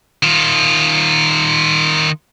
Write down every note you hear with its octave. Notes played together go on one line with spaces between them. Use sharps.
D#3 F4